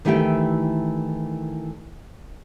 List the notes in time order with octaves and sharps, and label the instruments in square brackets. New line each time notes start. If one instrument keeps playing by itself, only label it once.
[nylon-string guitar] D#3 E3 A3 E4 G4 G5